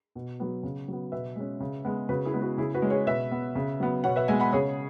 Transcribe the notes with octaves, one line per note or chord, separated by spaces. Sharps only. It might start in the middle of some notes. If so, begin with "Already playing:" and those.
B2
F#3 B3
C#3
F#3 B3
B2 B4 E5
G#3 C#4
C#3
G#3 B3
C#3 F#4 B4
E4 G#4
G#3 B3
F#4 B4
C#3 E4 G#4
F#4 B4
G#3 C#4
G#4 C#5
B2 B4 E5
B3
C#3
F#3 B3
B2 C#5 F#5
B4 E5
G#3 B3 E5 G#5
F#5 B5
C#3 G#4 C#5